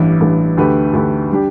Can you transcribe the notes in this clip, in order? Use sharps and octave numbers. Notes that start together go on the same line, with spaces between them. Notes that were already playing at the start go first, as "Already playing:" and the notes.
Already playing: A1 G2 E3
A1 G2 E3
D2 D3 A3 G4 B4
D2 D3 A3 G4 B4
G3 D4 G4